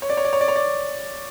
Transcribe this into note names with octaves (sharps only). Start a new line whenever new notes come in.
C#5
D5
C#5
D5
C#5
D5
C#5
D5